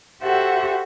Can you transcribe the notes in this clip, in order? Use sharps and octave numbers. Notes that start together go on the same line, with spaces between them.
F#4 G4 A4 C5 E5 F#5